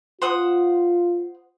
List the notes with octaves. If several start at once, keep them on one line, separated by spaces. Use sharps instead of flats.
F4 C5 F#5 D#6